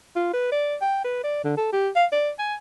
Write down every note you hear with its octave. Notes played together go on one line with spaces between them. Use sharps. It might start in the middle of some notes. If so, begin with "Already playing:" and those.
F4
B4
D5
G5
B4
D5
D3
A4
G4
F5
D5
G#5